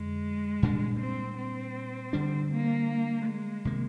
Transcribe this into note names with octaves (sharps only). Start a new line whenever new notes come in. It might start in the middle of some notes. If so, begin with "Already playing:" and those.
Already playing: F2 D3 G#3
A#2 G3 D4
C4
C4
D3 G3 D4
A#3
G#3
C3 D#3 A#3